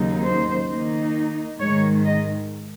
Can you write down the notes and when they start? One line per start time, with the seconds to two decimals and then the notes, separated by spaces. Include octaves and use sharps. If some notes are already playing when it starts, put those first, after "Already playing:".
Already playing: D#2 C#3 F#3 A#3 D#4
0.24 C5
0.69 D#3 A#3 D#4
1.60 G#2 D#3 G#3 C#5
2.05 D#5